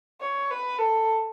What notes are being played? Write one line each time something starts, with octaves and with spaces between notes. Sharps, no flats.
C#5
B4
A4